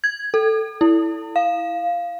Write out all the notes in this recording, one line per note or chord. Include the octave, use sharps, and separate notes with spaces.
G#6
A4
E4
F5